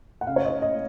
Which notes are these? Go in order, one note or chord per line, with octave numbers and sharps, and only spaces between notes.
F#5
C#3 F5
C#5
D#4 D#5
D#5